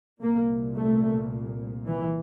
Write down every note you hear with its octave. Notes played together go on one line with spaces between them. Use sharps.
C2 A#2 A#3
A3
E3